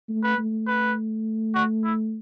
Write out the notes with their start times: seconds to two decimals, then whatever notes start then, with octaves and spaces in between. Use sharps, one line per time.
0.09 A3
0.23 B4
0.38 A3
0.67 B4
1.54 F#4
1.84 E4